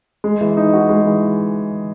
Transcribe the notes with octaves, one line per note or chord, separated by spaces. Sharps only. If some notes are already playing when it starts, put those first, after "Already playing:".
G#3
E3
D#4
F#4
G#3
E3